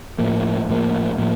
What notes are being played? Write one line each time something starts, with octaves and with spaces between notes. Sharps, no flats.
A2 F3 A#3
A2 F3 A#3
A2 F3 A#3